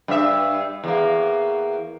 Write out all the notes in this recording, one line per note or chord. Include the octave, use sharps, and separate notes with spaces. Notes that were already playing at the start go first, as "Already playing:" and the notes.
G2 E5
E2 A#3